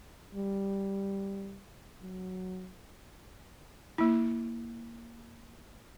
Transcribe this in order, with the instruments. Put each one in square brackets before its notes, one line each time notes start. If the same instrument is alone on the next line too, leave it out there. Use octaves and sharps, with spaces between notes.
[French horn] G3
F#3
[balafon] A#3 E4